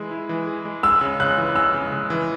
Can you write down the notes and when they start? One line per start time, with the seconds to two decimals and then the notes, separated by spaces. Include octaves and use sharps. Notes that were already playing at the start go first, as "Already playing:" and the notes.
Already playing: E3 G#3 E4 G#4
0.11 E4
0.29 E3
0.47 G#4
0.65 G#3
0.83 G#3 E6
1.01 C#3
1.20 C#3 F#6
1.38 E3
1.55 G#3 E6
1.74 C#3
1.92 C#3
2.10 E3